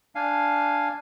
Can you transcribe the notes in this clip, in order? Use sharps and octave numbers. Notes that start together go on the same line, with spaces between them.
D4 F5 G#5